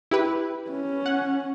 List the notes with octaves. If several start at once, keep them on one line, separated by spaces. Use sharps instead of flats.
E4 G4 B4
C#4
F#5